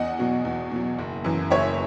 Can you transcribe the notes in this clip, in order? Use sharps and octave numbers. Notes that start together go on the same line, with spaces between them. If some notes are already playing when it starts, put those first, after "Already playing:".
Already playing: E2 D#5 F#5
B2 F#3
E2
B2 F#3
F#1
F#2 E3
F#1 C#5 E5